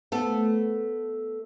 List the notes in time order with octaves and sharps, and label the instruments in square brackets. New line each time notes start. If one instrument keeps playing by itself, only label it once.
[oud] A3 B3 A4